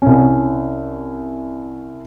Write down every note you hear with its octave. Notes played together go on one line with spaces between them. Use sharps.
C2 C#4